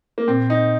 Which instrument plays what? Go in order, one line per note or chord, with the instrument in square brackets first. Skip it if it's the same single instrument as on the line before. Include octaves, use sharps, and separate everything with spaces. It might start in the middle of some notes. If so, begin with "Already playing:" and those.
[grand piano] A#3
[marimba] A#2 [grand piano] C4
[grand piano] D#4